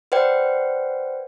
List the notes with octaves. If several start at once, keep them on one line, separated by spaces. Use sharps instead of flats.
B4 C5 D5 F#5 G5